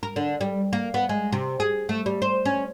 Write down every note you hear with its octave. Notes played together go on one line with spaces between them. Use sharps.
A#4
D3
G3
A#3
B3
G#3
C3
G#4
A3
G3
C5
C#4